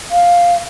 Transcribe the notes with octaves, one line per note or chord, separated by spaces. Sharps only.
F5